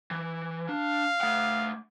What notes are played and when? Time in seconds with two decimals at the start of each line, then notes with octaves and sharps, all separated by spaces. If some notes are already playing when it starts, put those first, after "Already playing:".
0.11 E3
0.69 D4 F5
1.21 A3 F#5